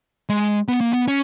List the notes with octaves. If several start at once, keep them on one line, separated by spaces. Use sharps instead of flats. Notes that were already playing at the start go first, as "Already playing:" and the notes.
G#3
B3
A#3
B3
C#4